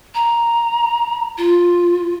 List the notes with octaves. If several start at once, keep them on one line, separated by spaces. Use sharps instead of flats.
A#5
F4